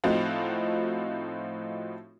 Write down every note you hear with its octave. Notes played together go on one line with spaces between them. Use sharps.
A2 F3 C4 D#4 F4 F#4